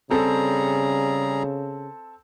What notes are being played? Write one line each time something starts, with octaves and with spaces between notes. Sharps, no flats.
C#3 G3 C4 G#4 A4 A#5